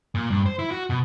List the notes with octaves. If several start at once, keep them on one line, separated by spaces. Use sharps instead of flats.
A#2
G2
C5
E4
F#4
B2